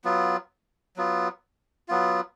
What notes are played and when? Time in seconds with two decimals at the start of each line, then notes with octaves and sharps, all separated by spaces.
0.04 F#3 B3 F4
0.97 F#3 B3 F4
1.88 F#3 B3 F4